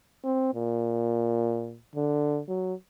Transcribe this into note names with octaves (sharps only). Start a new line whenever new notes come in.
C4
A#2
D3
F#3